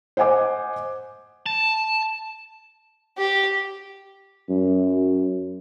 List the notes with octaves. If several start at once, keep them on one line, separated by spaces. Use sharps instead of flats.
C5 D#5 F#5 G#5 D6
A5
G4
F#2